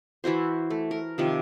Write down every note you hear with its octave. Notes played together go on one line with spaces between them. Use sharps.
E3 E4 F#4 C5
A3
A#4
C3 D#3 F3